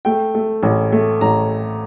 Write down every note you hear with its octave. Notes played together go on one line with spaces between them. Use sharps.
A3 G5
A3
A1
A3
A1 A#5